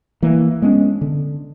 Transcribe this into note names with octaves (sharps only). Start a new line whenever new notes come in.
E3 A#3
G#3 B3 C#4 D4
D3